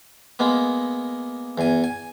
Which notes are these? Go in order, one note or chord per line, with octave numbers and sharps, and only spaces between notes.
G#3 A#3 B3
E2 G#5
G#5